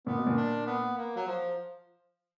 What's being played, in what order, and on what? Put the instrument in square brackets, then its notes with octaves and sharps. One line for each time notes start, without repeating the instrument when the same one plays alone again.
[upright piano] A#2 [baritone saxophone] B3
[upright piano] B2
A#2
[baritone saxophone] D4
B3
A#3
F#3
F3